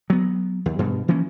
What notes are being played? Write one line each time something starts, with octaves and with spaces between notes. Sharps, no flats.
F#3 B3
D#2
G2 B2
E3 F3 A#3 C#4